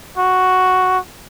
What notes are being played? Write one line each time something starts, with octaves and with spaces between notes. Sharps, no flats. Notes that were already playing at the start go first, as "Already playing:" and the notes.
F#4